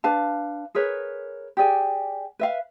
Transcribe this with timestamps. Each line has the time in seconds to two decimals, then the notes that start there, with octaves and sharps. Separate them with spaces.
0.04 D4 B4 F5 A5
0.75 G#4 A#4 B4 C#5
1.57 G4 G#4 D5 G#5
2.39 B4 E5 F5